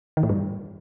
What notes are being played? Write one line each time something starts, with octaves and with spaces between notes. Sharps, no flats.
D#3
A2
G2